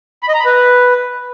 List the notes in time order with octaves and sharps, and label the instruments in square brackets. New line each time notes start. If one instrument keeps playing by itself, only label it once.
[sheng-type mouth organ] B5
D#5
A#5
B5
B4